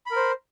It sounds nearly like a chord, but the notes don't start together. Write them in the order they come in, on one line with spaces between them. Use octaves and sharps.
B5 A#4 C5